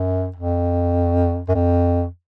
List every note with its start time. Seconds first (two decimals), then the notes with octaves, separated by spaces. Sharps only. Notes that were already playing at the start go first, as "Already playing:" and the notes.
Already playing: F#2
0.36 F2
1.48 F#2
1.55 F2